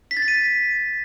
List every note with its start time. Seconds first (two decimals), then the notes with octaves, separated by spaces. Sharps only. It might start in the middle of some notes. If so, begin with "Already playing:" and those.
0.11 B6
0.17 A6
0.22 B6
0.28 D#7